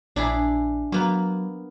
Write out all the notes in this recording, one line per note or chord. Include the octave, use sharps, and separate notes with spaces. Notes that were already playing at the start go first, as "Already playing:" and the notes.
A#1 D4 E4 G#4
F#3 A#3 B3